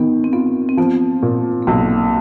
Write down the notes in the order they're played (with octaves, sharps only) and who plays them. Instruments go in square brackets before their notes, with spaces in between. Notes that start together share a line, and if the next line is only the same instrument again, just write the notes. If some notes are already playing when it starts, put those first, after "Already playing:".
Already playing: [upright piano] D#3 [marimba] B3
[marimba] C4
[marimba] B3 [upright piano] F4
[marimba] C4
[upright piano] F3 [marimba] B3
[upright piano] A#2
[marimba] A#3
[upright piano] B1 [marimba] B3
[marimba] A#3